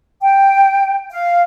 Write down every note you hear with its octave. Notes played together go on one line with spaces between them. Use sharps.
G5
F5